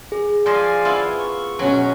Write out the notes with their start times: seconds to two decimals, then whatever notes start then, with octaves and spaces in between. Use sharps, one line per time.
0.12 G#4
0.46 F3 C5 D5 D#5 F5 G#5
0.85 B3 E4 F4
1.19 C#6
1.59 B2 F#3 C#4 F#4